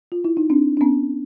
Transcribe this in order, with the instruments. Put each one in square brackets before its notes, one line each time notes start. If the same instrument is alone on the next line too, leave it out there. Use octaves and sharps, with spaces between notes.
[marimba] F4
E4
D#4
C4 D4
D4
B3 C#4